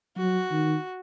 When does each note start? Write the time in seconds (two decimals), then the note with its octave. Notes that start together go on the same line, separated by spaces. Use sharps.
0.17 F#3 F#4
0.51 D#3